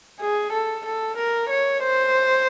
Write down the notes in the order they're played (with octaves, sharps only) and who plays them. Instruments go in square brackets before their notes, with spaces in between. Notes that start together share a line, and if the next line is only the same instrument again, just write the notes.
[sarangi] G#4
A4
A4
A#4
C#5
C5